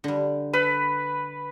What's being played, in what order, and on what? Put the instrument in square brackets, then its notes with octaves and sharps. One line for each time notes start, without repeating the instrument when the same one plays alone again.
[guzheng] D3 G3
[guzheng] A4 [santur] B4